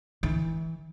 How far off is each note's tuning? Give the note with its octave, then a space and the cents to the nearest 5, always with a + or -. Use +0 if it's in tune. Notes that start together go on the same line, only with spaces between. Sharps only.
E3 -25